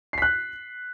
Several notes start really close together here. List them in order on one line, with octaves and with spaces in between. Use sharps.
C7 B6 F#6